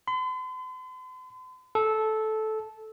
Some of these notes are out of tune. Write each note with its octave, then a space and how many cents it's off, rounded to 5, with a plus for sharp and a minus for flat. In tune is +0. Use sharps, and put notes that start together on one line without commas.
C6 -45
A4 -15